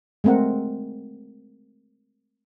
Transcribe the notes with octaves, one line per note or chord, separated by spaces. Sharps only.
G#3 A3 C4 A#4 F#5